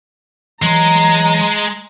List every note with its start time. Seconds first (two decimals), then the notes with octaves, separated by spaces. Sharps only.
0.62 E3 F#3 G#3 A#5 C6